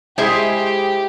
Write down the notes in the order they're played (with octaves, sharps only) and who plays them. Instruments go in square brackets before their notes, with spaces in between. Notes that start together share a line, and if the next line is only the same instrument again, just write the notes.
[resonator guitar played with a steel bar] G#3 E4 G#4 C5 E5 [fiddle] G4